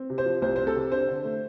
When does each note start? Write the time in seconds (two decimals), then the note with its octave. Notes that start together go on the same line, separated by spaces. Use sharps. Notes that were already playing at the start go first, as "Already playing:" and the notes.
Already playing: C4
0.10 C3
0.18 C5
0.25 F3
0.42 C2 C5
0.56 C4 C5
0.67 A4
0.75 C3
0.92 D4 C5
1.08 D3
1.25 A3